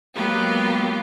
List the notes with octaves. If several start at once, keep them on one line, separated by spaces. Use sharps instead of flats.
F#3 G#3 A#3 B3 F4 G4